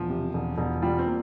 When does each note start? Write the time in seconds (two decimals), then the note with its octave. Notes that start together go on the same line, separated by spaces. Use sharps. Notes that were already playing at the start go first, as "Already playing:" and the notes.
Already playing: E1 F3
0.10 C3
0.34 E1
0.58 E1
0.82 G3 F4
0.99 C4
1.07 A#3